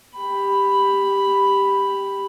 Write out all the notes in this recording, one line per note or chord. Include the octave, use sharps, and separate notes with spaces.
G4 B5